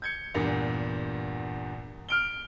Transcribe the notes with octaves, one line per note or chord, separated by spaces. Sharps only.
G6 G#6 C#7
E2 G2 A#2
F6 D7 G7